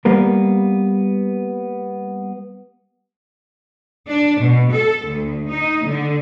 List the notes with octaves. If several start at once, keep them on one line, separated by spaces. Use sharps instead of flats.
G3 A#3 B3 A#4
D4
B2
A4
D2
D#4
D3